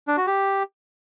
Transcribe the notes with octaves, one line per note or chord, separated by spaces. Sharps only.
D4
F#4
G4